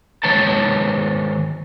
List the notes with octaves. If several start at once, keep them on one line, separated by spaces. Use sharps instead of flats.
D#3 G#3 B4 C#5 A5